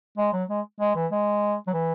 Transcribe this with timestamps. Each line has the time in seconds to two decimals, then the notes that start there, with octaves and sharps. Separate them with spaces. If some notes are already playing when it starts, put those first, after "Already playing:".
0.18 G#3
0.33 F#3
0.49 G#3
0.80 G#3
0.95 E3
1.12 G#3
1.67 F#3
1.73 E3